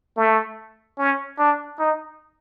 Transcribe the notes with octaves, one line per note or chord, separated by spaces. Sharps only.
A3
C#4
D4
D#4